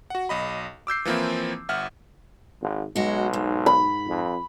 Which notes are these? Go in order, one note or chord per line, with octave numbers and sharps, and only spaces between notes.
F#4 F#5
B1 D#5 B5
D6 E6 G6 C7
E3 F3 A#3 C4 E4
G1 E5 F#5 F6
G#1
B1 G#3 F#4
G#2
B5
F2